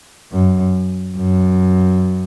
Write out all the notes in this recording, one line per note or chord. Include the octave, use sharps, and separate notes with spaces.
F#2
F#2